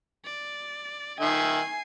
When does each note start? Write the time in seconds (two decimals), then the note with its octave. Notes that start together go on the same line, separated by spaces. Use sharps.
0.25 D5
1.20 D#3 E5 G#5 C7